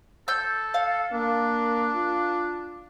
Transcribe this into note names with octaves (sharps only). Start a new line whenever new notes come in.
A4 E6 G6
F5
A#3 D4
F4